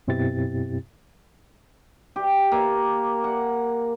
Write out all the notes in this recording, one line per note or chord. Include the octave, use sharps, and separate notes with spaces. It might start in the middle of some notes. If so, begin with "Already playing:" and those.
F#2 B2 C4 E4 G4 A6
G4
A#3
F#5